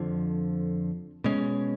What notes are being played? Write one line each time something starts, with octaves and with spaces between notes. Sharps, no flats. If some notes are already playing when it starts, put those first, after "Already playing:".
Already playing: F2 D3 F3
B2 G#3 C#4